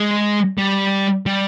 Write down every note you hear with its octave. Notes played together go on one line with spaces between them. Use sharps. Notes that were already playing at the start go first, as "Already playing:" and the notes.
Already playing: G#3
G3
G3